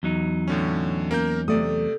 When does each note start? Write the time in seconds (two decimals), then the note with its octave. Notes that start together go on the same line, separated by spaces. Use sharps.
0.03 E2 F#3 D#4
0.48 A2 D3 C#4
1.11 A#3 C#4 A#4 G6
1.48 C3 A3 D5 D#6